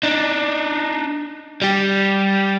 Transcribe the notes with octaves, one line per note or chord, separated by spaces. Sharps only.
D4 D#4
G3 G4